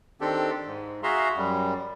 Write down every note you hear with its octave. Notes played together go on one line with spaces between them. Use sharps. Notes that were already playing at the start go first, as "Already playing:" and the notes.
D#3 C4 D4 G4 A4
G#2
F#4 G#4 E5 F5 A#5 C6
F#2 G3